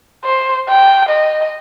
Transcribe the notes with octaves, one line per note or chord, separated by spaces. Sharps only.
C5
G5
D#5